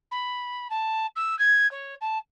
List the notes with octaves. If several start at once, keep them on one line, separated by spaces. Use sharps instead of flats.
B5
A5
E6
G#6
C#5
A5